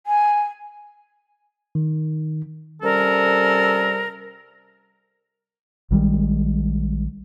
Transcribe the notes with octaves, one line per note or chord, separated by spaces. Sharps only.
G#5
D#3
C3 G3 C#4 A4 A#4
A#1 D#3 G3 G#3